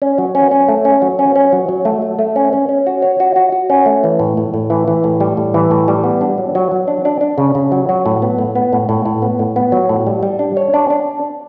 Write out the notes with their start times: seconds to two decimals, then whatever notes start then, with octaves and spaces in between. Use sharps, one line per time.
0.02 C#4
0.18 F#3
0.35 C#4
0.51 C#4
0.68 A3
0.85 C#4
1.02 F#3
1.19 C#4
1.36 C#4
1.53 F#3
1.69 F#3
1.85 A3
2.02 A3
2.19 A3
2.36 C#4
2.53 C#4
2.69 C#4
2.87 F#4
3.02 C#5
3.20 F#4
3.36 F#4
3.52 F#4
3.70 C#4
3.86 A3
4.04 E3
4.19 A2
4.37 A2
4.54 A2
4.70 E3
4.88 E3
5.04 A2
5.20 G3
5.37 A2
5.54 E3
5.71 A2
5.88 G3
6.04 B3
6.21 D4
6.38 F#3
6.55 F#3
6.71 F#3
6.88 D4
7.05 D4
7.21 D4
7.38 C#3
7.55 C#3
7.72 F#3
7.89 F#3
8.06 A2
8.22 B3
8.39 A2
8.55 B3
8.73 A2
8.89 A2
9.06 A2
9.22 B3
9.39 A2
9.56 B3
9.72 F#3
9.89 A2
10.07 G3
10.23 G3
10.39 D4
10.57 C#5
10.74 D4
10.90 D4